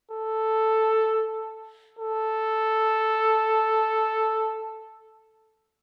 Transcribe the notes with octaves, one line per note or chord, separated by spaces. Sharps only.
A4
A4